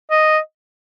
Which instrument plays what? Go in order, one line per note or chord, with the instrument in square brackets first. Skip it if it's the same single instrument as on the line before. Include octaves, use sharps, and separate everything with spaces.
[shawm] D#5